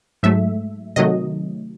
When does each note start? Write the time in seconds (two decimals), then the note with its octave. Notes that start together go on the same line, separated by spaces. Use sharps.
0.23 G#2 F#3 A3 E5
0.96 C3 D#3 F#3 A3 D#5